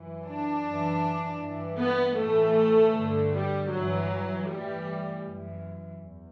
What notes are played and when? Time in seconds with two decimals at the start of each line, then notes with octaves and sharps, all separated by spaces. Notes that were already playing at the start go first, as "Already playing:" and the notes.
Already playing: F#2 E3
0.27 D4
0.66 F#2 E3
1.41 G2 E3
1.80 B3
2.18 A2 E3 A3
2.95 G2 D3
3.33 G3
3.71 G2 E3 F#3
4.49 A2 E3 G3
5.25 F#2 E3
6.01 E2